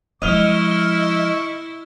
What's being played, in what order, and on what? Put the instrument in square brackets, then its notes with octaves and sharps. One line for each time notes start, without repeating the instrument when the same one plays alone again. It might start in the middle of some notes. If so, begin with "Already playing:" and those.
[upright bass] F3 G#3 [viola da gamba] E4 [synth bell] D#5 F6 G7 [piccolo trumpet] C#6